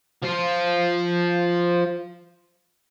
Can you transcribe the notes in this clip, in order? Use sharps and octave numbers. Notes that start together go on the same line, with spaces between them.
F3 F4